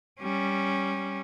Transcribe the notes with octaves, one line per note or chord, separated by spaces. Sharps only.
G3 C#4